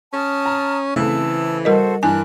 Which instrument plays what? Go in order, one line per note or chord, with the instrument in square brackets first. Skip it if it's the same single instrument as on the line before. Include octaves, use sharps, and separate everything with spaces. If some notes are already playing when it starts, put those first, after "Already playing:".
[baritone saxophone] C#4 [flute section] A5 D#6 F6
[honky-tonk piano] A#5
[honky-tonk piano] C#3 A3 C4 [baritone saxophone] E3 [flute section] A5 E6
[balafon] G3 A#4 D#5 [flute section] F#4 A4 C5
[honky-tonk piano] G2 E3 [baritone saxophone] D4 [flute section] A#4 F#6 [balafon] G#5